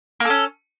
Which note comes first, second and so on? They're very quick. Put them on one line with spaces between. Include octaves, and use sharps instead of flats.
A#3 A4 C#4